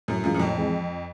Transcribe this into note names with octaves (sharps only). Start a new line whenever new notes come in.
F#2 A2
F#2 E3 G#3 C#4 F4
F#2
F2 A2
E3 G#3 C4